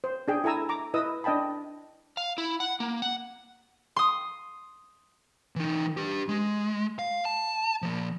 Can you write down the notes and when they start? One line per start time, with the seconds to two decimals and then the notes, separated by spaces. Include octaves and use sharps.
0.04 C5
0.28 D4 G#4 G5
0.44 E4 A4 G#5 A#5 E6
0.69 A#5 D6
0.94 E4 B4 D#5 D#6 E6
1.24 D4 D#5 G5 A5 B5
2.17 F5
2.38 E4
2.60 F#5
2.80 A#3
3.02 F#5
3.96 C6 D#6
5.56 E3 D#4
5.97 D4 G4
6.29 G#3
6.99 F5
7.25 A5
7.82 F3 A#3